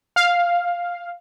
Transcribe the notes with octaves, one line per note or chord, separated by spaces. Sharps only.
F5